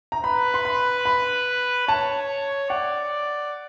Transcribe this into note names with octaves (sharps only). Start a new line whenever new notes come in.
A#5
B4 B5
C6
B5
B5
C#5 A5
D5 F#5